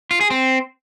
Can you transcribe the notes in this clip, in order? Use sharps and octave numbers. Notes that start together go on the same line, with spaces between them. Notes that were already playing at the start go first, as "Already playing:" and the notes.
F4
G#4
C4